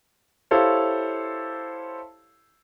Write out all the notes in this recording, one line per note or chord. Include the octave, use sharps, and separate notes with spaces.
E4 G4 A4 C5 C#5 F5